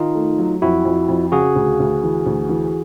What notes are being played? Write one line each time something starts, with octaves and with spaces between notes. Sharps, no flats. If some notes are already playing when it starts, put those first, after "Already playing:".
Already playing: D#3 D#4 F4
A3
F#3
F2 E4 F#4
F2
F2
C#3 F#4 G#4
D2
D2
E3
D2
E3